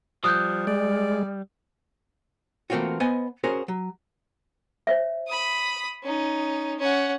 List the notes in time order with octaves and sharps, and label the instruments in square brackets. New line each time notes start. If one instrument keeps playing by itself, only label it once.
[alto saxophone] F3 [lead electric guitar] G3 [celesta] D#6 F#6 G6
[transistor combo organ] G#3 [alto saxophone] D5
[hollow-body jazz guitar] E3 A3 A#3 C4 F4 F#4
B3 C5 D#5 G#5
C#4 F#4 G#4 A#4 C5
F#3
[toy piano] C5 C#5 E5
[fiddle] B5 D#6
C#4 D#4
C#4 F#5